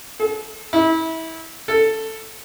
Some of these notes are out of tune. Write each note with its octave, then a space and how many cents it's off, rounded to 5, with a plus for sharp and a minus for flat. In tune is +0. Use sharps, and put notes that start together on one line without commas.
A4 -40
E4 -30
A4 +5